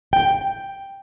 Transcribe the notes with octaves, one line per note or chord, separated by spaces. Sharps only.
G5